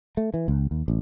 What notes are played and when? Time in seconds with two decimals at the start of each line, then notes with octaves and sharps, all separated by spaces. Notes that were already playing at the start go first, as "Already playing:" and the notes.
0.17 A3
0.34 E3
0.48 C#2
0.71 D#2
0.88 A1